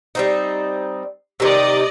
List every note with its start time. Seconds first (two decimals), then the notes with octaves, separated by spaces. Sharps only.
0.15 G3 C4 D#4
1.40 C3 D#3 D5 D#5